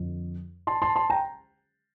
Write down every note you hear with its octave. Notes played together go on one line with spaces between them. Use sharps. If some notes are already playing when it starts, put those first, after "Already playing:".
Already playing: F2 D3 F3
A5 C6
A5 C6
A5 C6
G5 A#5